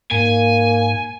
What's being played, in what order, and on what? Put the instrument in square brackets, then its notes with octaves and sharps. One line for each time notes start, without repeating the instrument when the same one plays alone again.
[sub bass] G#2 [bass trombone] A#3 [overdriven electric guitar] G#5